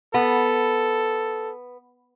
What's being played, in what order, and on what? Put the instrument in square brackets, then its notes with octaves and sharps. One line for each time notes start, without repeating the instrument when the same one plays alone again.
[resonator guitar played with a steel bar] B3 [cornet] A4